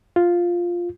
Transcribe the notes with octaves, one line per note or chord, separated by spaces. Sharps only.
F4